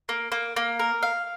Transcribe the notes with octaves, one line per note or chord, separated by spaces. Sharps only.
A#3
A#3
A#3
A#4
F5